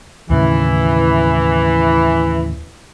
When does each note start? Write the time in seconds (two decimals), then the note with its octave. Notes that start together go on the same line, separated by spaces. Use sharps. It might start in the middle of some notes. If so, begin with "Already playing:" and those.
0.30 D#2 A2 C#3 E3